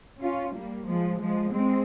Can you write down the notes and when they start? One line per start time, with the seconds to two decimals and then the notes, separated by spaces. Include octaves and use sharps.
0.21 C#4 F4
0.55 G3 A#3
0.87 F3 G#3
1.20 F3 G#3
1.53 G#3 C4